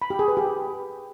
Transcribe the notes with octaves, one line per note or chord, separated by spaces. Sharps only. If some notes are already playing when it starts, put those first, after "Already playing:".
B5
G4
G#4
B4
G4